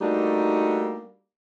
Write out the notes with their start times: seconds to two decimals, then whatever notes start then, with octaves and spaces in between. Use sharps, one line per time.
0.01 G3 A3 A#3 D4 D#4 F#4